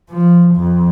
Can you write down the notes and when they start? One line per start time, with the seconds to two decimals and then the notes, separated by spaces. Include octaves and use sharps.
0.10 F3
0.56 F2